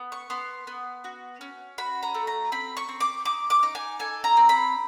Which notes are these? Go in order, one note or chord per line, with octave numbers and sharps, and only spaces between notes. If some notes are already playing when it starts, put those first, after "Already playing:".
Already playing: B3
C#6
B3 C6
B3
F#4
C#4
F#4 B5
A#5
A3
A#5
C4 B5
C#6
C4
D6
D#4 D6
D6
D#4
G#5
A4 G#5
A#5
C4
B5